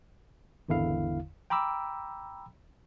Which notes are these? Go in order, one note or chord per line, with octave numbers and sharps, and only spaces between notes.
G#1 E2 D3 E4 F5
G5 A#5 B5 D6 E6